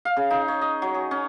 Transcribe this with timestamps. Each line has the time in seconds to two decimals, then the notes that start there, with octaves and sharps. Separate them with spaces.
0.05 F5
0.17 C#3
0.30 D#4
0.48 C#5
0.61 D#5
0.82 F#3
0.94 G#4
1.11 C#4